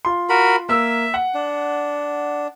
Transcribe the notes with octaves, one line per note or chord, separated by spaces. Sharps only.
F4 C6
F#4 A#4 B5
A#3 E5 E6
F#5
D4